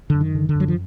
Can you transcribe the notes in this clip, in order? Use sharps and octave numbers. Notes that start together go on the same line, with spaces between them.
F#2 D3
D#3
D3
D3
F#2
F#3
F3